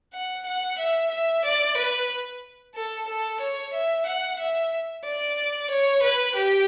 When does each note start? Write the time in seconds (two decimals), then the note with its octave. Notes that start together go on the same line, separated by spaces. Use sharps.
0.14 F#5
0.46 F#5
0.79 E5
1.11 E5
1.45 D5
1.77 B4
2.75 A4
3.08 A4
3.40 C#5
3.73 E5
4.06 F#5
4.39 E5
5.04 D5
5.70 C#5
6.03 B4
6.35 G4